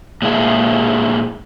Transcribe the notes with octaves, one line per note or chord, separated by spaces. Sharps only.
A#2 G#3 E4 G#4